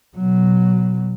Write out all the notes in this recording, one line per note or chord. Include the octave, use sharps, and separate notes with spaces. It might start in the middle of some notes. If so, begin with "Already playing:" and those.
B2 F#3